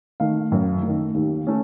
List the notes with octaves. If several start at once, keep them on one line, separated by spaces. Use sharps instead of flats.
D#3 A3 F5
F#2
D#3 A3
D#2
A3 C#4